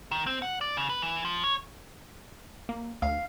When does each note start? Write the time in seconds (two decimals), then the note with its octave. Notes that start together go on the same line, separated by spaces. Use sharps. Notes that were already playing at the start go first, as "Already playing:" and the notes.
0.11 D#3
0.26 C4
0.42 F#5
0.61 D5
0.77 C#3
0.89 B4
1.02 E3
1.25 F3
1.44 C#5
2.69 A#3
3.02 D2 F5